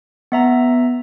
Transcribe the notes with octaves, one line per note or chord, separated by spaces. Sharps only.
B3 E5 A#5